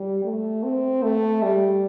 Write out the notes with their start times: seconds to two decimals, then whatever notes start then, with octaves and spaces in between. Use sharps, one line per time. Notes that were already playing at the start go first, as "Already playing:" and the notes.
Already playing: G3
0.24 A3
0.63 C4
1.03 A3
1.42 G3